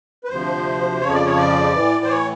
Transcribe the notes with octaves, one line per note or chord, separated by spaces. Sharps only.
B4
D2 C3 F3 C5
F2 C#3 F3 C#5
D5
C#5
D5
A2 E3
C5
C#5